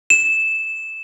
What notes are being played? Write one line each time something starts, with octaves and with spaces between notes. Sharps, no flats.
E7